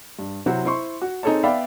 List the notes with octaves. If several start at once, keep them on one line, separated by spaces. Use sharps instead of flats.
G2
C3 F#3 C4 E4 F#4
E4 C5 C6 C#6
F#4
C4 D#4 G#4 A4 C#5 A5
B3 D5 E5 F5 G5 B5